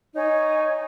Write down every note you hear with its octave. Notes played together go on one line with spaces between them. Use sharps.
D#4 C#5 G#5